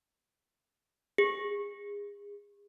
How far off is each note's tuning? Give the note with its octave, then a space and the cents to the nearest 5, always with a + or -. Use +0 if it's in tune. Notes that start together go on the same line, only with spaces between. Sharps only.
G#4 -30